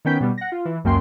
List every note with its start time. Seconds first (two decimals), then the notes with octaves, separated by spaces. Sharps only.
0.05 D#3 B3 C#4 G5 G6 B6
0.20 B2 G3 B3
0.38 F#5 A#6
0.52 F4
0.65 E3
0.84 C#2 F#2 A#3 C#4 G5 C6